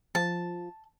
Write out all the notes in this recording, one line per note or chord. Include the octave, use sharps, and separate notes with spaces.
F3 A5